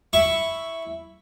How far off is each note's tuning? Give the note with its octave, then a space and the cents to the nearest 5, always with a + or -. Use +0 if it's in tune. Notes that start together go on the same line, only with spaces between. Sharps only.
E4 +0 C#6 +0